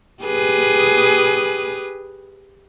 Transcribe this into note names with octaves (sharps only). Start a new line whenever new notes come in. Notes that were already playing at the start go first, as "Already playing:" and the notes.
G4 G#4 B4